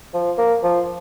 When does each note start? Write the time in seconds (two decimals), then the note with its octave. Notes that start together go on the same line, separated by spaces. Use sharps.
0.14 F3
0.38 A#3
0.63 F3